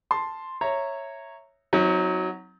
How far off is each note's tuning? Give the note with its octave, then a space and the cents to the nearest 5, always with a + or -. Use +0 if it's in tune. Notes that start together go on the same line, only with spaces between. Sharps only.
A5 +0 C6 +0
C#5 -10 E5 +0 A#5 -10
F#3 +0 C4 +0 D#4 +45